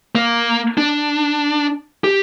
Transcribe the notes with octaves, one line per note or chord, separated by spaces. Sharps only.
A#3
D4
G4